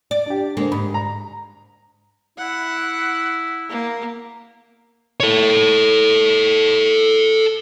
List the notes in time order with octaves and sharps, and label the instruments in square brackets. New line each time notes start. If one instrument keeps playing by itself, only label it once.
[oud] D5
[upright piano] D4 G4
[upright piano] D3 C5 [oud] G#3 A#3
[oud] G#2 [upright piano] B5
[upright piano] A#5
[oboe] E4 [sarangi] F#5
[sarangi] A#3
[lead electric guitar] A4 C#5